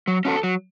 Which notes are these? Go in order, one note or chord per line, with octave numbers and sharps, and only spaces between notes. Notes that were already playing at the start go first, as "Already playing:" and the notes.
F#3
C#4 F#4 A4
F#3